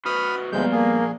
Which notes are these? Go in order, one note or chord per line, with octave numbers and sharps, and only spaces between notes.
F#4 B4 C5 B5 D#6 F6
D2 A#2 F3 G3 G#3 B3 F5 G6
A#3 G#4